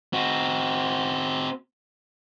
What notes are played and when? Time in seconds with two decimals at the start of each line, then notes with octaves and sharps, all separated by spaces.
0.13 C4 F#4